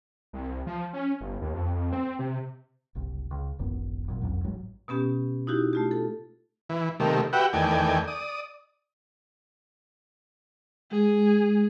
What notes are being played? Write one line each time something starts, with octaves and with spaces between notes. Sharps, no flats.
C2
F3
C#4
G1
D#2
F2
F2
C4
C3
F#1 C2
C#2
D1 G#1 F#2 B3
G#1 A#2 F#3
F#1 C2 F2 F#3
A1 G#2 F#3 G3
B2 B3 C#4 G4
D#4 E4 F#4 G4
A3 F4 G4
A4
E3
C3 D#3 G3 A3 A#3
F#4 G4 B4 E5 F#5 G5
E2 D#3 A3 D5 G5 G#5
D5 D#6
G#3 G#4